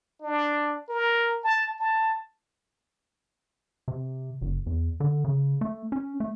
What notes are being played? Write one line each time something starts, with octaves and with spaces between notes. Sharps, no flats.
D4
A#4
A5
A5
C3
F#1
E2
D3
C#3
A3
C#4
A3